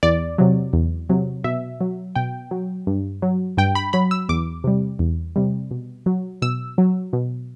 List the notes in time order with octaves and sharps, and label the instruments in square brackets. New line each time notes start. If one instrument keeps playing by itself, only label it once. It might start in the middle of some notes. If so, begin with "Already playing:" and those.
[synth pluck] E2 D5
C3 F#3
E2
C3 F#3
B2 E5
F#3
B2 G5
F#3
G2
F#3
G2 G5
B5
F#3 B5
E6
E2 D6
C3 G3
E2
C3 G3
B2
F#3
B2 E6
F#3
B2